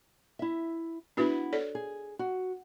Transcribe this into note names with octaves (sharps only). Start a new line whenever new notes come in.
E4 E5
B3 D4 E4 F#4 B4
A4 C#5 D5
G#4
F#4